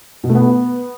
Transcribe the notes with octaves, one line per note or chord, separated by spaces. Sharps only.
B2
A3
B3